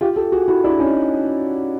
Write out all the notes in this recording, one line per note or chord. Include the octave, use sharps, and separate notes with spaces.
F4 G4
G4 A4
F#4 G#4
E4 F#4
D4 E4
C#4 D#4